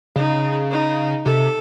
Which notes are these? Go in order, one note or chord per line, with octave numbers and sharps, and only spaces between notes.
C#3 D#4
D#4
C3 A4